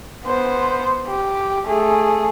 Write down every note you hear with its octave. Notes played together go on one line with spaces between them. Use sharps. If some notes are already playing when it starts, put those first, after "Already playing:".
B3 C5
G4
A3 G#4